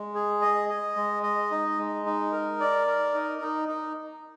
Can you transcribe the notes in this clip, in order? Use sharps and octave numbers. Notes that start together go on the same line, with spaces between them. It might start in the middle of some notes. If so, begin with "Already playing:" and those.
Already playing: G#3
G#4
D#5
D#5
G#3
D#5
D#4
G#3
D#4
A#4
D5
A#4
D#4
D#4
D#4